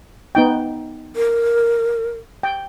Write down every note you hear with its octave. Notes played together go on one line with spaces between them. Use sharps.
B3 D#4 G5
A#4
G5